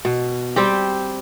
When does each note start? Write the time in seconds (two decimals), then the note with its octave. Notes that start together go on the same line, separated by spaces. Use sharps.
0.05 B2
0.56 G3 C4 G4